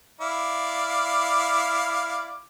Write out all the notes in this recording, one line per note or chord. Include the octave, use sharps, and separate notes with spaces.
E4 D5 F5